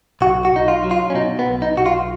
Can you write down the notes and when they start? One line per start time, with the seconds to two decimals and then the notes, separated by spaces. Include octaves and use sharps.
0.21 B1 F#4
0.45 F#4
0.52 B1 D#4
0.68 F4
0.84 F#3
0.91 F4
1.10 C#4
1.14 B2 D#4
1.39 B3
1.46 B1
1.62 D#4
1.77 B1 F#4
1.86 F4